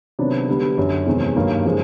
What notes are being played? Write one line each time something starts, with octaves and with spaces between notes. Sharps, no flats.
C3 D#3 F#3 B3 D4
D3 G3 B3
F#2 D3 F#3
E2 C3 D#3 G#3
G2 D#3 F#3 A#3
C#3 F3 G#3